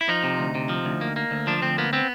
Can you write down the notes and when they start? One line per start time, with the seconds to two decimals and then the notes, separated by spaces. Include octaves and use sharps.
0.01 E4
0.08 F3 D#4
0.23 C3
0.39 D2
0.55 C3
0.69 F3
0.85 D2
1.01 A#3
1.16 A#3
1.31 D2
1.47 F3 D4
1.62 D2 C4
1.78 A#3 B3
1.93 B3 C4